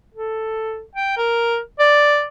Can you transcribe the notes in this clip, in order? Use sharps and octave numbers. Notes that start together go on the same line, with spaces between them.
A4
G5
A#4
D5